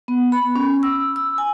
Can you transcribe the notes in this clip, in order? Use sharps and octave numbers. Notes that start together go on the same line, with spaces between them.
B3
B5
C#4
E6
E6
G#5